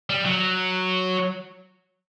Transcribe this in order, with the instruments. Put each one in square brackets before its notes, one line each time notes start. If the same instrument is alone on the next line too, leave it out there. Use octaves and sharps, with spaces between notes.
[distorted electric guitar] G3
F#3